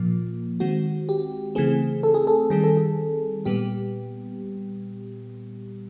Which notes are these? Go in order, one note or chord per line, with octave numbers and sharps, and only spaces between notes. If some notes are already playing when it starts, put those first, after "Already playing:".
Already playing: A#2 F3 A#3
D#3 G#3 C4 F#4
G4
C#3 E3 A3 C4 G#4
A4
G#4
A4
D#3 G3 C4 G#4
A4
G#4
A#2 G3 B3 G4